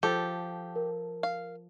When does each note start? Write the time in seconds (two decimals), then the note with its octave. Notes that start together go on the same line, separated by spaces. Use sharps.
0.03 F3 G4 A4
0.76 A#4
1.23 F5